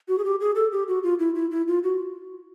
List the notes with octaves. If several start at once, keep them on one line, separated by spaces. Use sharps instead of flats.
F#4
G#4
G4
G#4
A4
G4
F#4
F4
E4
E4
E4
F4
F#4